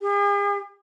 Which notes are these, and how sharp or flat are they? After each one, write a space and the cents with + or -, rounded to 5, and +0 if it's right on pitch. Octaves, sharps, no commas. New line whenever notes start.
G#4 -45